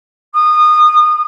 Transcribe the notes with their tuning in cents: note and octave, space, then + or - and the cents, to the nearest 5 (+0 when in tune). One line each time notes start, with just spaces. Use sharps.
D#6 -25